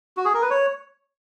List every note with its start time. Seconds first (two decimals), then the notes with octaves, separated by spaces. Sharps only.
0.17 F#4
0.25 G#4
0.34 A#4
0.42 B4
0.50 C#5